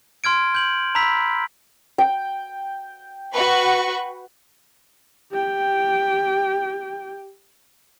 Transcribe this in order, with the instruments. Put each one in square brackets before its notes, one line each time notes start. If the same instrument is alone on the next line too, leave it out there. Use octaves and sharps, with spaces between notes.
[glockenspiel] C6 F6 G#6 D7
G6 F#7
A#5 B5 E6 B6
[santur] G5
[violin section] F#4 B4 C#6
[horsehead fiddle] G4 G5